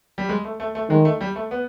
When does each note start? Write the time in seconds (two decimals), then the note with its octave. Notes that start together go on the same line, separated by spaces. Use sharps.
0.18 G3
0.29 G#3
0.45 A3
0.60 A3
0.75 A3
0.90 D#3 G#3
1.05 A3
1.21 G3
1.36 A3
1.51 B3